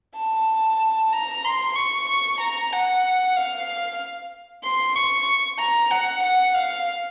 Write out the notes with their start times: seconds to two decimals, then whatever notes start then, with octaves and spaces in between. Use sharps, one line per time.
0.16 A5
1.12 A#5
1.44 C6
1.76 C#6
2.09 C#6
2.40 A#5
2.72 F#5
3.36 F5
4.64 C6
4.95 C#6
5.58 A#5
5.91 F#5
6.23 F#5
6.55 F5